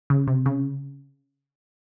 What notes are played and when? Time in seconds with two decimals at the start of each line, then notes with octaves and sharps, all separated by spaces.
0.10 C#3
0.27 C3
0.46 C#3